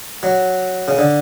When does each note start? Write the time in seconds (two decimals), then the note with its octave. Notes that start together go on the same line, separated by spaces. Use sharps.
0.23 F#3
0.88 C#3
0.98 D3